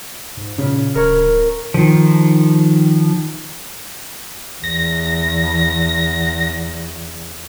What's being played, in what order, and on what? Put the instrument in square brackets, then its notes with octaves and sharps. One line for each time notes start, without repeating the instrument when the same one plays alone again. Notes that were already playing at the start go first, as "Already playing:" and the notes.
[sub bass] G#2
[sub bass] A#2 [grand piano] C#3
[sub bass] D1 [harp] A#4 C#5
[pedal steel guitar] D#3 F3
[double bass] E2 [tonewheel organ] A#6